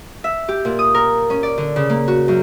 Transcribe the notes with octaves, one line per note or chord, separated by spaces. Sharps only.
E5
G4
A#2
D#6
A#4
C#4
D5
D3
C#3
A#3
F#4
F#2